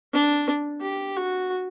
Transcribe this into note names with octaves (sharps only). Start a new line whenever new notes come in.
D4
G4
F#4